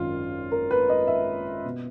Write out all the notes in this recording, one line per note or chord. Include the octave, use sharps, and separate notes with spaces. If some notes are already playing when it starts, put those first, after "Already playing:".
Already playing: G#1 F#2 D#3 F4
A#4
B4
D#5
E5
B2